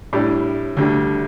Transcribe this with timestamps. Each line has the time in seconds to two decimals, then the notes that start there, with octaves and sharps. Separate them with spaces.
0.13 A2 G3 D4
0.77 D2 D3 G3